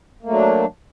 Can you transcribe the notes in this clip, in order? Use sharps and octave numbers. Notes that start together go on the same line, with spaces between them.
F#3 A3 A#3 D4